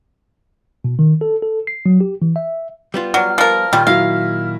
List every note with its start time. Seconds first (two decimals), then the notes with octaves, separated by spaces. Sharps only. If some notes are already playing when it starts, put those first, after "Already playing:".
0.84 B2
0.99 D#3
1.21 A4
1.42 A4
1.67 C7
1.86 F#3
2.01 G4
2.22 E3
2.36 E5
2.94 G3 B3 F4
3.14 F#3 D5 F6
3.38 F3 A#4
3.73 A#2 D#3 G3 F4
3.87 F#3 E4 F5 A#6